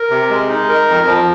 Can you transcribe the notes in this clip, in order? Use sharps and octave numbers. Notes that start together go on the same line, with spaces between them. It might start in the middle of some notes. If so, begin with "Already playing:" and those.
Already playing: A#4
C3
G#3
D#4
A#4
F2
F3